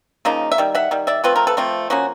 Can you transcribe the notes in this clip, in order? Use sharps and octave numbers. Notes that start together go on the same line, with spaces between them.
C#3 F3 A#3 D#4
E5
D#3 G3
E5 F#5
D#3 G3
D5 E5
F3 A3 C4 F4 B4
A#4
A4 B4
F3 A3 C4 F4
F3 A#3 C#4 F#4